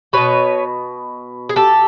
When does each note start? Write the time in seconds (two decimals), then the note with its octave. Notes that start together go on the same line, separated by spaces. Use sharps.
0.13 B2 G3 B4 C#5
1.49 G#4
1.56 G4 A4